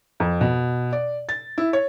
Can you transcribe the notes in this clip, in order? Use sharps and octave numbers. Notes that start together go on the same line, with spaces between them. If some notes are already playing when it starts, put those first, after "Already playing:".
F2
B2
D5
A6
E4
C#5